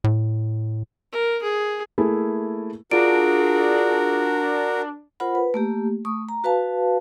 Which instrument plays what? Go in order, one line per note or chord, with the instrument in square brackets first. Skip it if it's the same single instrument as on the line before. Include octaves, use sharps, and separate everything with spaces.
[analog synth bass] A2
[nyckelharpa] A#4
G#4
[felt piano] A3 A#3 E4 G#4
[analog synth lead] D4 [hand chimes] F4 D7 [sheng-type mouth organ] F#4 A#4 [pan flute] G#4
[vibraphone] F4 A#4 C5 F#5 B5
B4
A3 A#3 G4
A3 C#6 D#6
A#5
F#4 B4 F5 A5